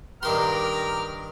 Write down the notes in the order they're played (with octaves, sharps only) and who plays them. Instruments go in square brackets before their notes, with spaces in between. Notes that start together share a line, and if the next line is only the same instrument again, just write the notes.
[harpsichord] G2 D#3 C6 [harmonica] G4 A#5 F6 [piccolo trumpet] A#4